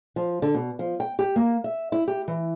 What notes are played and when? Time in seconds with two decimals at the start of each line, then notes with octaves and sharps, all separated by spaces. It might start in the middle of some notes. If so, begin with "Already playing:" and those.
0.16 F3
0.42 D3
0.55 B2
0.79 F3
1.00 G5
1.19 G4
1.36 A#3
1.64 E5
1.92 E4
2.08 G4
2.28 E3